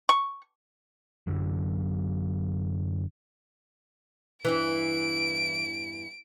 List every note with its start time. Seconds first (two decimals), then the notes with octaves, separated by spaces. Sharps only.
0.09 C#6
1.27 F#2 D3 F#3
4.45 E2 G2 E3 E4 D7